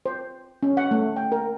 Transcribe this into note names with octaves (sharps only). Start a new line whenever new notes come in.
C5
C#4
F#5
A3
G5
A#4